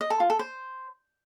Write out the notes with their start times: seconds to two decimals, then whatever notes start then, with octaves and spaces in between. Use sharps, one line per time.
0.01 D#5
0.10 A4
0.20 F4
0.30 A4
0.39 C5